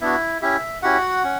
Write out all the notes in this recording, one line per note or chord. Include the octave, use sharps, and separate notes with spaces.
B3 D4 E4 F#4 E5
C#4 E4 G4 E5
C#4 E4 F#4 G4 F#5
C#4